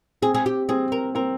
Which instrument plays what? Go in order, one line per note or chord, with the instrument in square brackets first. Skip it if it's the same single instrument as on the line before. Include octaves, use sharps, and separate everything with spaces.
[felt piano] C4 [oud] G#4
[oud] G#4
G4
[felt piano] C4 [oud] G#4
[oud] A#4
[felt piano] C4 [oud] A#4